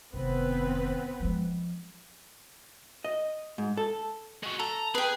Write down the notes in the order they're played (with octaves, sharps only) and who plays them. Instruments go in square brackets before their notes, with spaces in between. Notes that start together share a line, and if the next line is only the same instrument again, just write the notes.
[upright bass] F1 D#3 [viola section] B3 C4 B4
[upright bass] F3 G#3
[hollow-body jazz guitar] D#5
G#2
A4
[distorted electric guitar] G#3 F#4
[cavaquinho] A4 [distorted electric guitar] A#5
[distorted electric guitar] G#4 [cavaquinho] B4 G5